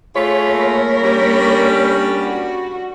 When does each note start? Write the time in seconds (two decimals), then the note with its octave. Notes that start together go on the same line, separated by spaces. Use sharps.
0.16 A3 F4 G#4 C#5 B5
0.48 A#3 A#4
1.03 G3 C#4 D4
2.23 F#4